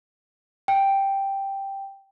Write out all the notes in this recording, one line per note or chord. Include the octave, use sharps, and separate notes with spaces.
G5